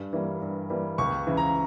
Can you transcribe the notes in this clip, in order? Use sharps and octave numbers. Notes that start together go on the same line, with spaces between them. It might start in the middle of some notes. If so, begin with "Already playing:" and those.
Already playing: G2
E3 G3 A#3
G2
E3 G3 A#3
C#2 C#6
C#3 E3
A#5